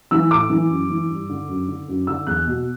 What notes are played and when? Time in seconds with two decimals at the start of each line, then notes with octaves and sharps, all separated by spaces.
0.11 E3 E6
0.31 A2 D6
0.50 E3
0.70 F#2
0.90 E3
1.09 G2
1.29 D3
1.48 F#2
1.68 D3
1.88 F#2
2.07 D3 E6
2.27 E2 F#6
2.47 B2